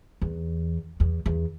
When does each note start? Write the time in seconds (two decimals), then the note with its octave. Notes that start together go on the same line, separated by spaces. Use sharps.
0.22 E2
1.00 E2
1.26 E2